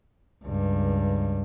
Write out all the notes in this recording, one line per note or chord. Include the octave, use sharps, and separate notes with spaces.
C#2 G2